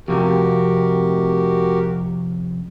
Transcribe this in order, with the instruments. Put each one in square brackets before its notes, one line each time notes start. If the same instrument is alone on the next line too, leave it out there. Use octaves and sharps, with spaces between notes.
[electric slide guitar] F2 C3 [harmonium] F#4 G4 A#4